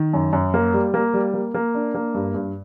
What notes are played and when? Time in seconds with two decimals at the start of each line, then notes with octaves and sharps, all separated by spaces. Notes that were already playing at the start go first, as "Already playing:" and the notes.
Already playing: D#3
0.13 F#2
0.33 F#2
0.54 A#3
0.74 G3
0.94 A#3
1.14 G3
1.34 A#3
1.54 A#3
1.75 D4
1.94 A#3
2.14 G2
2.34 G2